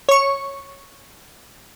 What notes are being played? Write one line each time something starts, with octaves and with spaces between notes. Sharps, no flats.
C#5 C#6